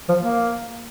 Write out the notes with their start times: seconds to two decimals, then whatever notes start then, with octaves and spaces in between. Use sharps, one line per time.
0.09 F3
0.23 A#3